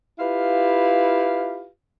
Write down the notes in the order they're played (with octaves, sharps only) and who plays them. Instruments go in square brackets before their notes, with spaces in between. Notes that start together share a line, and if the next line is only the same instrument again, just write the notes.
[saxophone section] E4 F4 G4 B4 F5